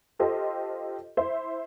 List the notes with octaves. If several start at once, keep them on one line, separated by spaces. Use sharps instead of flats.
F4 G4 A4 C5 D#5
E4 C5 E5